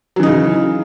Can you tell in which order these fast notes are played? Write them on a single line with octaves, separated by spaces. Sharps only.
F#3 E3 D#4 C#3